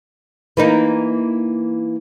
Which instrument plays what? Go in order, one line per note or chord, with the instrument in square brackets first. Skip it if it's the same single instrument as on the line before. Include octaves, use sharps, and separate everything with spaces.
[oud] E3 A#3 D#4